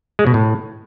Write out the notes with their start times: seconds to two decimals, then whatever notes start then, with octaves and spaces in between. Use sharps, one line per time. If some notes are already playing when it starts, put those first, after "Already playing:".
0.19 G#3
0.27 B2
0.34 A2